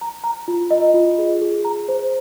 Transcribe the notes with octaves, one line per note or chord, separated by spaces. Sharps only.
A#5
A#5
F4
D#5
F4
G#4
G#4
A#5
C5